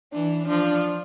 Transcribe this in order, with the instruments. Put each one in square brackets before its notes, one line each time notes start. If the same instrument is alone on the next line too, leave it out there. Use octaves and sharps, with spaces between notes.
[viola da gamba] E3 [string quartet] D4
[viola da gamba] F3 [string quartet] D4